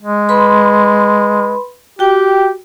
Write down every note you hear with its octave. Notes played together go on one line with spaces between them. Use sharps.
G#3
B4 B5 C6
F#4 G4 G5